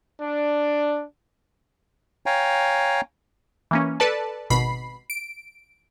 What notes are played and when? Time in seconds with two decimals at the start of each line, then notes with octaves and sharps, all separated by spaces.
0.22 D4
2.26 C#5 F5 G5 G#5 A#5
3.71 E3 A#3 C#4
4.00 A4 B4 D5 A5
4.50 G#1 B2 B5 C7
5.10 D7